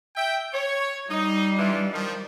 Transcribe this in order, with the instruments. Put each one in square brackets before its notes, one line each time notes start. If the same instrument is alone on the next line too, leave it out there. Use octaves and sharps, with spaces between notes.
[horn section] E5 G5
C#5
[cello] G3 [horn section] D#4
[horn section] E3 D4 F4
D#3 F3